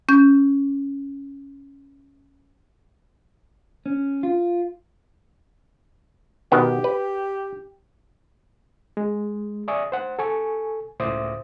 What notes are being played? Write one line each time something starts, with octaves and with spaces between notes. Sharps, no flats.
C#4 G6
C#4
F4
B2 D#3 B3 G4
B4
G#3
D5 E5 G#5 C#6 D#6
C5 F#5
A4 G#5 C#6
C#2 A2 C5 E5 D6 D#6